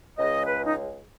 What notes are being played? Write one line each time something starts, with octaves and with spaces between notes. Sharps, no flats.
C#2 C#3 G#3 D#5
B4
D#4